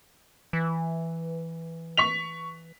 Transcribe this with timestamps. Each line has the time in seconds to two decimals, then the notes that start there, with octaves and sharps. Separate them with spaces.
0.53 E3
1.97 C#6 B6 F7